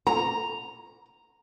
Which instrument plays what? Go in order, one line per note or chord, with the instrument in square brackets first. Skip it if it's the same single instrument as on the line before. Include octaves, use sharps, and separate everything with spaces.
[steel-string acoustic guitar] A#5